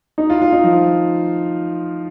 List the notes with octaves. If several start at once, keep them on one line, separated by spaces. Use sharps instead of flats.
D#4
F4
F4
D#4
F3